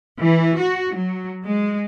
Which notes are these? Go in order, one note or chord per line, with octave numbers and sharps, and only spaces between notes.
E3
F#4
F#3
G#3